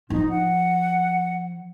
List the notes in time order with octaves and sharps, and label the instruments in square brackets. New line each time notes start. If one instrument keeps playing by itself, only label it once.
[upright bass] F3 [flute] D#4
[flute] F#5